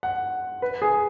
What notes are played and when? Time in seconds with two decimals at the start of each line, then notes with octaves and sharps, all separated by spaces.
0.03 F#5
0.62 B4
0.82 G#4